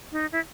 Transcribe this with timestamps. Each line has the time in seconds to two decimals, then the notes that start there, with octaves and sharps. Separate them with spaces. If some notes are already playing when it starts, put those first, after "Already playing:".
0.12 D#4
0.32 E4